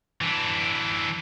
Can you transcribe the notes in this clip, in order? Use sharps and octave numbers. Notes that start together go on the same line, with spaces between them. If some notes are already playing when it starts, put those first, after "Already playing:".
E3 D4